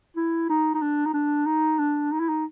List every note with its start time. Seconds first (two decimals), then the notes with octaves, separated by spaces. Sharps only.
0.16 E4
0.49 D#4
0.74 D#4
0.82 D4
1.05 D#4
1.13 D4
1.46 D#4
1.79 D4
2.12 D#4
2.20 E4
2.29 D#4